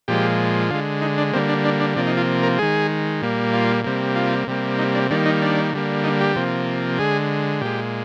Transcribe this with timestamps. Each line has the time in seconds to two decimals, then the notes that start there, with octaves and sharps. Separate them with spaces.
0.08 A#2 F3 G#3 G4
0.70 D3 G#3 F4
1.02 D#4
1.18 D4
1.33 D3 G3 A#3 C4
1.49 D4
1.65 D4
1.81 D4
1.96 C3 F3 A#3 D4
2.07 D#4
2.17 F4
2.43 A#4
2.59 D#3 G#3 G#4
3.22 A#2 G3 A#3
3.53 F4
3.84 C3 G3 A#3
4.16 F4
4.47 C3 G3 A#3
4.79 D#4
4.95 D4
5.11 D#3 G3 A#3 D4
5.26 D#4
5.42 D4
5.73 D3 G3 A#3
6.04 D#4
6.20 G4
6.36 C3 F3 A#3
6.99 D3 G#3 G#4
7.61 A#2 G#3 G4